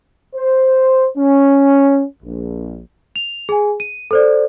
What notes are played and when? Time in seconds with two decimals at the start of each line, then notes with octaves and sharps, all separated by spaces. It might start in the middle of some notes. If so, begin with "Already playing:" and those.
0.34 C5
1.17 C#4
2.23 A#1
3.16 F7
3.49 G#4 G#5
3.80 D#7
4.11 A4 C5 D5